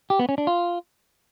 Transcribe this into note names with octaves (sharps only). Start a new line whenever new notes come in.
G4
B3
C#4
D4
F4